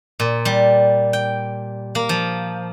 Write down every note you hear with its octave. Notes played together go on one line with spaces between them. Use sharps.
A#2
G3
G5
A#3
F3